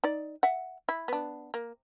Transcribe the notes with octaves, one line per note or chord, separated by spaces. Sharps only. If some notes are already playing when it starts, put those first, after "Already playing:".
D#4 D5
E5 F#5
E4
B3 D4
A#3